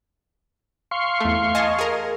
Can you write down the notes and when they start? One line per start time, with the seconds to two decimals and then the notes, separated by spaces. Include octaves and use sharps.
0.91 F5 C6 C#6
1.20 E2 A3
1.55 D#5 G#5 A5
1.78 G#4 A#4